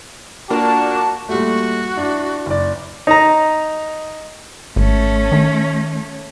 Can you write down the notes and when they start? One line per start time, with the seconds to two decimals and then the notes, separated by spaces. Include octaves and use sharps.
0.50 A#3 D4 F4 F#4 A#4 A5
1.29 A#2 G3 A3 F#4
1.96 D4 E4
2.46 F#1 D5
3.07 D#4 A#5
4.76 G#1 A3 C#4
5.32 D#3